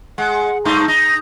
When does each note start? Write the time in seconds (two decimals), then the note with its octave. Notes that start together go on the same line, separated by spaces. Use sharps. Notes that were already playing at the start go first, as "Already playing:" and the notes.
0.18 G#3 F#5
0.65 G2 A3 D#4 C6
0.88 D#4 A#6